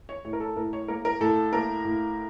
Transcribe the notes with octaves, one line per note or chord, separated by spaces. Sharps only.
C#5
A2 C#5
A#4
A4
A2 A#4
C#5
A#3 A#4
A#4
A2 A4
A#3 A#4
A2